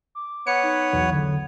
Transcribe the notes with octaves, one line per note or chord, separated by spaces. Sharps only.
D6
B3 B4 C#5 C#7
D#4
B1 E2
D3